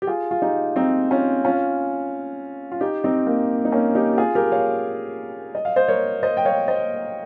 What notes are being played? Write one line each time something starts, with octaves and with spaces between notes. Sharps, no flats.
G4
F4 G#4
F4
D#4 G4
C4 D#4
C#4 F4
C#4 F4
F4
D#4 G4
C4 D#4
A#3
D#4
A#3 C#4
D#4 G4
G4
F4 G#4
G4 A#4
C#5 F5
D#5
F5
C5 D#5
A#4 C#5
C5 D#5
G5
C#5 F5
C5 D#5